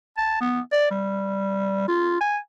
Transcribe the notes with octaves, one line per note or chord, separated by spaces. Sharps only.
A5
B3
D5
G3
F4
G#5